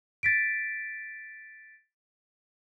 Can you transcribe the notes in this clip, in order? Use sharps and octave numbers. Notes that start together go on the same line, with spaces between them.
A6 B6 D7